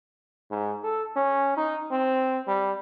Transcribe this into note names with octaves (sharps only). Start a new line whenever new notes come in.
G#2
A4
C#4
D#4
C4
G3